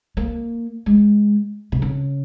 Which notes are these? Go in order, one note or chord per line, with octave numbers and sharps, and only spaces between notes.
A#3
G#3
B2
C#3